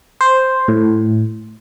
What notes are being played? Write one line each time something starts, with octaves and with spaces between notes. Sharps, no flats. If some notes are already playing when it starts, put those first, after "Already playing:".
C5
A2